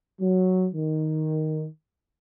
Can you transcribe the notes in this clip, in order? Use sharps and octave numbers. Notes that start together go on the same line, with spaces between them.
F#3
D#3